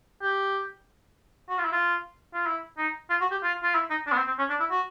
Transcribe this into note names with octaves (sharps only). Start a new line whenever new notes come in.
G4
F#4
F4
E4
F4
F4
E4
D#4
F4
F#4
G4
F4
F4
E4
D#4
D4
B3
C4
C4
C#4
D4
E4
F#4